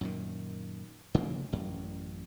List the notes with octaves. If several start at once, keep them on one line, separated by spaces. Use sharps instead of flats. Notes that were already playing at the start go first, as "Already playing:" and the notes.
F#2 A#2 D#3
C#3 F3 A3 A#3
A1 F#2